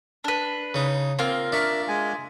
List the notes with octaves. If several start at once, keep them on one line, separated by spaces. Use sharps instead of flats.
D4 B4
C#3 D#4
A#3 C4 F4
D4 A#4 E5 C#6
G#3 G#5